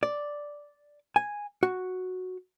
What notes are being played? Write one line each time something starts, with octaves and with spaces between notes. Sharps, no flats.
D5
G#5
F#4